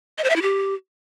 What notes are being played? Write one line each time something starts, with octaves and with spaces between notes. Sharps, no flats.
D#5
C5
E5
E4
G4